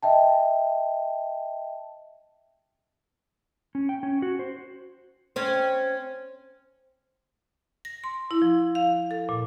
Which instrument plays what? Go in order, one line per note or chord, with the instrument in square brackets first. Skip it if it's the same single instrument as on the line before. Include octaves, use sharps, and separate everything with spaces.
[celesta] D#5 E5 G5 A5
[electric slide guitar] C#4
G5
C#4
F#4
C5
[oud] C4 C#4
[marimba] A#6
C6
E4
F3
F5
A4
A#2